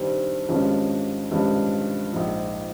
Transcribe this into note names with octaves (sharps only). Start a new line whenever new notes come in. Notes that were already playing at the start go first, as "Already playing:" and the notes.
Already playing: G2 D#3 G3 C4
G#1 G2 F3 G#3 C#4
G#1 G2 F3 G#3 C#4
A#1 G#2 F3